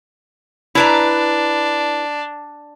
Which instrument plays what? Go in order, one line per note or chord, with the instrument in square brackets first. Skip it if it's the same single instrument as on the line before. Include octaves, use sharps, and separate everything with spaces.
[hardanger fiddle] D4 [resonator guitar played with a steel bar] E4 B4 A#5